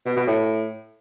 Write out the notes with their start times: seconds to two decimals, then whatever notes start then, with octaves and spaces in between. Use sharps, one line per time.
0.06 B2
0.17 B2
0.27 A2